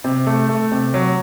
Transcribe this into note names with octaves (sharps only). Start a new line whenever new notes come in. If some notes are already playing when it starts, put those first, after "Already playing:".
C3
A3
A3
C3
F#3